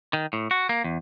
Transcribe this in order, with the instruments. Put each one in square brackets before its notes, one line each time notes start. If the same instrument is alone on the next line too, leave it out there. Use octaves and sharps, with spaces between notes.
[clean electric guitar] D#3
A2
F#4
A#3
E2